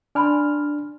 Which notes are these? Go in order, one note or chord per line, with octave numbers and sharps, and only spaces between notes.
D4 G#5 B5 C6 F6